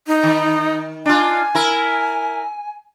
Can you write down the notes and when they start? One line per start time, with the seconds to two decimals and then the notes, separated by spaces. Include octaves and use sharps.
0.07 D#4
0.23 D#3
1.06 D4 F4 G#5
1.55 E4 A#4